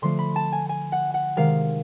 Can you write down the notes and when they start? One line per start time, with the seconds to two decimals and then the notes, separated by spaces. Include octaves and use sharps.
0.02 D3 F3 A3 C6
0.19 B5
0.36 A5
0.52 G#5
0.69 G#5
0.92 F#5
1.14 F#5
1.36 C3 D#3 G#3 F5